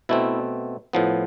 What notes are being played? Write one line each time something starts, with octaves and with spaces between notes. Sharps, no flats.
B2 A3 C4 E4
A2 F3 B3